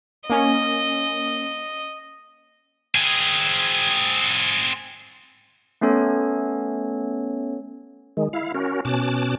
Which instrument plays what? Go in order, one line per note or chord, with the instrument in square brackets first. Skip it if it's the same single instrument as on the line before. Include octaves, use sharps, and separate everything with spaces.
[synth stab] A#3 C#4 [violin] D#5
[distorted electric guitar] C4 G#4
[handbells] A3 B3 C#4 A4 C#5
[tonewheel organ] D#3 G#3
E4 F5
C#4 F#4 A#4
B2 C#4 A5 D6 F#6